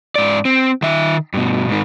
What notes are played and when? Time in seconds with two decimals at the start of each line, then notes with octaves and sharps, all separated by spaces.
0.16 G#2 D5
0.45 C4
0.82 D#3 E5
1.34 G2 B2
1.69 G#2 D#3